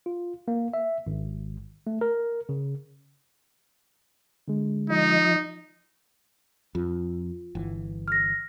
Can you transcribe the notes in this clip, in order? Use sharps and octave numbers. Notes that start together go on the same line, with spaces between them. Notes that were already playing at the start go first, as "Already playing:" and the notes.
F4
A#3
E5
G#1
A3
A#4
C#3
D3 G#3
F3 D#4 D#5
F2 F4
G1 E3
F6 A#6